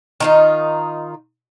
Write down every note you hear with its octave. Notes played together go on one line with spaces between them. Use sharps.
D#3 D#4 F4